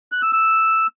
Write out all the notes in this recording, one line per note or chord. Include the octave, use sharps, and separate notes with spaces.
F#6
E6
E6